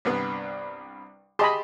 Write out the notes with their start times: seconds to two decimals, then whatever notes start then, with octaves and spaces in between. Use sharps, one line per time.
0.05 C2 G2 B3
1.39 G4 G#4 D#5 A5 B5 C6